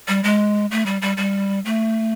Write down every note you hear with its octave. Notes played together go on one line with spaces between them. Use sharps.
G3
G#3
A3
G3
G3
G3
A3